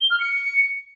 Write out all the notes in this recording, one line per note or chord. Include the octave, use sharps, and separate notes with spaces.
G7
F6
C#7